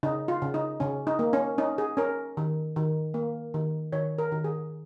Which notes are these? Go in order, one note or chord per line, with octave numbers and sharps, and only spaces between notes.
C#3 D#4
F4
C#3
D#4
C#3 C#4
D#4
A#3
C#4
C#4 D#4
G#4
C#4 A#4
D#3
D#3
A#3
D#3
D#3 C#5
A#4
D#3
G#4